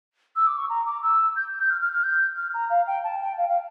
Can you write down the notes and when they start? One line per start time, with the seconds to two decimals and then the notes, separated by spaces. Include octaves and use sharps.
0.36 E6
0.47 D6
0.58 C#6
0.70 A#5
0.86 D6
1.03 E6
1.36 G6
1.59 G6
1.70 F6
1.81 F6
1.92 F6
2.03 G6
2.36 F6
2.54 A#5
2.70 F5
2.87 G5
3.04 A5
3.21 G5
3.37 F5
3.49 F5